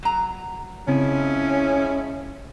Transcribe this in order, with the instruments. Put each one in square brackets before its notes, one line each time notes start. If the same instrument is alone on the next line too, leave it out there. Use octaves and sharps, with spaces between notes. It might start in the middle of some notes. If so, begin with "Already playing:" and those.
[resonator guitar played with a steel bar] F#3 A#5
[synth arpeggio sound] C#3 C4 [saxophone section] F3 G#3 E4 [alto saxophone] C#4